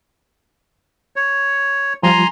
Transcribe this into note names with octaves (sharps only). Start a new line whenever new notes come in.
C#5
F3 G3 F4 G#5 A#5 C6